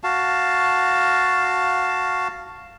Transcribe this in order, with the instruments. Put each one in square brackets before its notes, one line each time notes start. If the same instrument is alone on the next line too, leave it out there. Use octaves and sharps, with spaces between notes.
[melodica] F#4 F5 A5